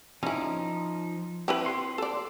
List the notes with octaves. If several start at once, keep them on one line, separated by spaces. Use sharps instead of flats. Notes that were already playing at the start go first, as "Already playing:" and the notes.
F3 C#4 D#4 E4
C4 E4 B4
C6
A4 D5